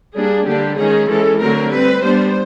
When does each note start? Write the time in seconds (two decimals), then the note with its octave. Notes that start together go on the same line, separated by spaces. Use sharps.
0.14 G3 A#3 D4 G#4
0.46 D3 G3 A#3 D4 G4
0.77 D#3 G#3 C#4 G#4
1.08 E3 G#3 C#4 A4
1.39 D3 F#3 A3 C4 A#4
1.71 G3 C4 B4
2.02 G3 B3 D4 C5